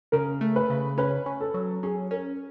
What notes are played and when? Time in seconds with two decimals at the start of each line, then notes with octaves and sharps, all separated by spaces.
0.12 C#3 A#4
0.41 A3
0.56 B4
0.70 C#3
0.98 C#4 B4
1.26 C#4
1.41 A4
1.54 F#3
1.83 C#4 G#4
2.11 C#4 A#4